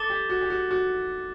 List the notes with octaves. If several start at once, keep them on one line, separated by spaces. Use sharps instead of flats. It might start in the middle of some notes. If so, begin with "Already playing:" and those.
Already playing: A4 D6 A6 E7 G7
G4
F#4
G4
F#4
F#4